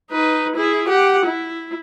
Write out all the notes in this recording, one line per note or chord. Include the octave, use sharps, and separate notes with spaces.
D#4 B4
E4 G#4
G4 F#5
E4